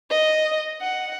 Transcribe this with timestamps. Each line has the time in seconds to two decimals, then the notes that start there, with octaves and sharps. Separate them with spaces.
0.10 D#5
0.82 F#5